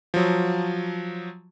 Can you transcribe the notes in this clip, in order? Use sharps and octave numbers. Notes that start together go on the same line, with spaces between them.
F3 F#3